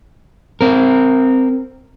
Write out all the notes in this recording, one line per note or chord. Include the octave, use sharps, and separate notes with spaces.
C4 A#4